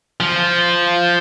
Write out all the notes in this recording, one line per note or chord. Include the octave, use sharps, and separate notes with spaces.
F3